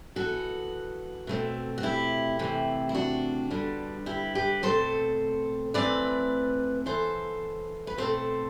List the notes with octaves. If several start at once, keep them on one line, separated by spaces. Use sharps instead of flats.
E3 B3 F#4 A4
B2 A3 C4
F#4
E4 G4
C3 E3 A3 C4
E4
D4 F#4
D3 G3 B3
E4 G4
G4 B4
B2 A3 C4 A4 C5
E3 A3 C4 B4 D5
E3 B3 A4 C5
B4
B2 F#3 A3 C4 A4 C5